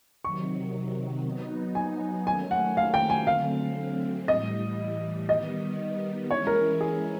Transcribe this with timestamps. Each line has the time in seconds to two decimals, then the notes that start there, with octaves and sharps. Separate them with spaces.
0.24 C3 D#3 F#3 C#6
1.25 F#3 B3 D#4
1.75 G#5
2.26 D#3 F#3 A3 C#4 G#5
2.51 F#5
2.77 F5
2.94 G5
3.10 G#5
3.27 D3 F#3 A3 C4 F5
4.28 A2 E3 G3 D#5
5.29 D#3 G3 B3 D#5
6.30 E3 G#3 C#4 E4 C#5
6.47 A#4
6.81 G#4